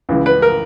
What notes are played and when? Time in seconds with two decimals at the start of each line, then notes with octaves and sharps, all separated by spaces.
0.09 C#2 C#3 E3
0.26 B4
0.42 A#4